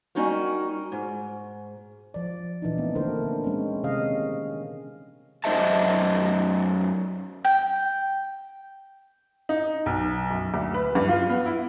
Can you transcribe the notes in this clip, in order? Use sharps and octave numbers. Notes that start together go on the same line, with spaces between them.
G3 C#4 D#4 F#4 A#4
G#2
F3 D5
A#2 E3 D4 D#4
A3 B3 C4
D3 A#3 D4 E4 A#4 C5
G#3 C4 C#4
C3 D#3 C#4 D#5 F5
F#2 D#4 C5 D#5 E5 A5
G5
D#4
B1
F#2
D2
B4
G2
F4
B3
E4